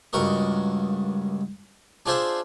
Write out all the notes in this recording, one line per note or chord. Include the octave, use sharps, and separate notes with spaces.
C#2 G2 F#4 A#4 D#5
D4 F4 G#4 C5 E5